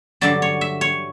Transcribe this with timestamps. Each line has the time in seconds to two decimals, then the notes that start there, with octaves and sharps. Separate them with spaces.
0.21 G2 D3 F#3 D5
0.42 C#5
0.61 E5
0.81 C#5